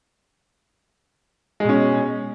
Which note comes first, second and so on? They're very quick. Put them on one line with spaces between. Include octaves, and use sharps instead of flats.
G#3 B2 C#4